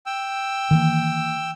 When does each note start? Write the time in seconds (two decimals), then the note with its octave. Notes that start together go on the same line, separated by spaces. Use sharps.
0.06 G5 E6
0.71 D#3 E3 A#3